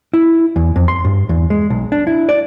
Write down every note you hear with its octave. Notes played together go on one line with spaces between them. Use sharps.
E4
E2
F2
C6
G2
E2
G#3
B1
D4
E4
D5